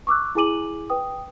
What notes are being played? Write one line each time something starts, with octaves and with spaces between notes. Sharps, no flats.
C#6 D6 E6 F#6
E4 G#4 G#5 D6 D#7 F#7
B4 G5 D#6